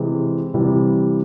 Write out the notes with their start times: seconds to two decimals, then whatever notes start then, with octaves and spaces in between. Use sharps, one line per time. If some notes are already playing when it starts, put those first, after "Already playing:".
Already playing: C3 E3 G#3
0.54 C3 E3 G3